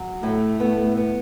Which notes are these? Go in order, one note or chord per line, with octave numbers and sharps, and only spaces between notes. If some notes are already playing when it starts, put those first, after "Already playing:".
Already playing: F#3
A2 A3
B3
B3